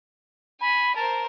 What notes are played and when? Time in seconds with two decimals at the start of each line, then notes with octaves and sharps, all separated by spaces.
0.61 G#5 B5
0.96 A#4 C5 A5